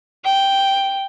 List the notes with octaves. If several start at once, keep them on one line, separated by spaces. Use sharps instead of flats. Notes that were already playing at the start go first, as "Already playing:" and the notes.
G5